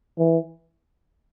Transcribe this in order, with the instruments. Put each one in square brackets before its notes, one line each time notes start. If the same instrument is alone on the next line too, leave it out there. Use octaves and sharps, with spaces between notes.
[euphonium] E3